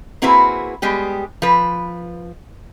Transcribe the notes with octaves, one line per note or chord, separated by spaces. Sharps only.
A#3 C4 E4 F#4 G#4 B4
G3 G#3 B3 G4
F3 B4